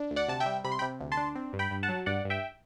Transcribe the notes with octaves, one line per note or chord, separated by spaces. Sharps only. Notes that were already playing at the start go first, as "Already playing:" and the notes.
Already playing: D4
D2
D5 F#5
C3 A5
E5 G5
G3
C3 B5
C6
G5 B5
C3
D2
A5 C6
D4
C4
G2
G5 B5
G2
F#5 A5
F#3
G2 D5 F#5
G2
E5 G5